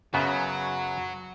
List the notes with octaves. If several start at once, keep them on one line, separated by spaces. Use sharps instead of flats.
F#2 C#3 F#3 B3 F#4